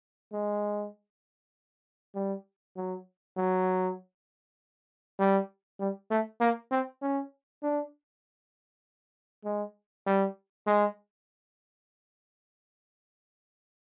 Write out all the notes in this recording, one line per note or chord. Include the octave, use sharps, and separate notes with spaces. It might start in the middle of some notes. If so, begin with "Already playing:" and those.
G#3
G3
F#3
F#3
G3
G3
A3
A#3
C4
C#4
D4
G#3
G3
G#3